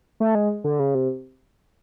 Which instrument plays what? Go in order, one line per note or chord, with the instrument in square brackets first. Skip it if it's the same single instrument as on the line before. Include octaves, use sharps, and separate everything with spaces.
[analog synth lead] A3
G#3
D3
C#3
C3